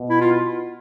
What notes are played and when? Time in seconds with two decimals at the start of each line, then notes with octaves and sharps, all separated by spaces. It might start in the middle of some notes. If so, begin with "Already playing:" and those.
Already playing: B2
0.10 E4
0.21 F4